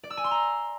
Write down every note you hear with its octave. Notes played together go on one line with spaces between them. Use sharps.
D5
E6
G#5
C6
A#5